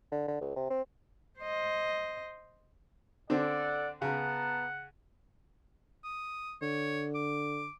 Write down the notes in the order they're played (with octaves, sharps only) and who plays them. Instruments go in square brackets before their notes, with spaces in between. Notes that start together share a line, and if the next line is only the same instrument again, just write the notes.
[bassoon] D3
D3
C#2
C3
C4
[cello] C5 D#5
[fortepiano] D3 C4 D4 [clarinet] A4 [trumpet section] D5 F#5
[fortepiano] C#3 [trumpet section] B3 A5 A#5 [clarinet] F#5
[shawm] D#6
[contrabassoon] D3 [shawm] C#5
[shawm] D6